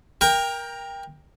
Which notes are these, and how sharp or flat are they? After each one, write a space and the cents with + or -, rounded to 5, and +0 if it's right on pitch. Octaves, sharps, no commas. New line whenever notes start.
A#4 +20 G5 +20 A#5 +0